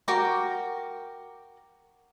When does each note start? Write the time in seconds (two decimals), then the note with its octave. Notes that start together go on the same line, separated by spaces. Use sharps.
0.08 F#4 A#4 G5 D6